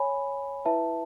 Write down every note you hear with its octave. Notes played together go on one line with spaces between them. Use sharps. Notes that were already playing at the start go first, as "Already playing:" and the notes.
Already playing: C#5 G#5 B5
E4 B4 E5 A5